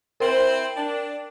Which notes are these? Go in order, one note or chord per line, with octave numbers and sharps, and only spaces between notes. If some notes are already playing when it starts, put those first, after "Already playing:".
C4 E4 A#4 C5 G5 F#7
D4